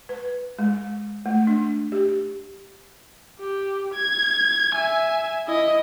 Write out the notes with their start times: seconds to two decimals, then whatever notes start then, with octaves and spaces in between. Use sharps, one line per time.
0.09 B4
0.59 G#3
1.26 A3
1.47 D4
1.92 G4
3.40 G4
3.94 G#6
4.74 E5 G#5
5.47 E4 D#5